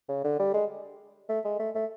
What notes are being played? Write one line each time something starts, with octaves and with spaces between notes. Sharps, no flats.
C#3
D3
G3
G#3
A3
G#3
A3
A3